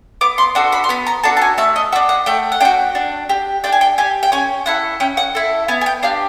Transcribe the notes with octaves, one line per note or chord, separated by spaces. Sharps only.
B3 D6
C6
D4 F#4 A4
B5
C6
B3 B5
A#5
D4 F#4 A4 A5
A5
G#5
A3 E5
D#5
D4 F#4 E5
F#5
A3 G5
F#5
D4 F#4 G5
D4
G4
D4 G5
G#5
G5
G4 G#5
G5
C#4 G#5
E4 A4 F#5
C#4 G5
F#5
E4 A4
B3 G#5
G#5
G5
D4 G4 F5